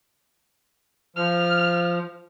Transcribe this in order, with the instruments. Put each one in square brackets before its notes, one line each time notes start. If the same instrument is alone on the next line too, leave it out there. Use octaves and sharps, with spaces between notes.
[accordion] F3 [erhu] F6